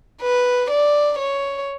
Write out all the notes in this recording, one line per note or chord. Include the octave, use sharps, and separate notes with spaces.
B4
D5
C#5